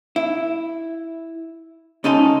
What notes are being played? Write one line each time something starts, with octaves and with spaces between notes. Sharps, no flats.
E4
C#2 C#4 D#4 A4 G#5 C6